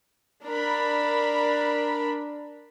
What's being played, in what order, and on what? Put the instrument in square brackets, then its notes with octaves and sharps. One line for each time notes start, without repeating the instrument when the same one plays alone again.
[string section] D4 A#4 B5